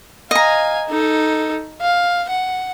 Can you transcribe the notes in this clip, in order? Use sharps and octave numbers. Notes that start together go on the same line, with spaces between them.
D#5 F5 G#5 A#5
D#4 A4
F5
F#5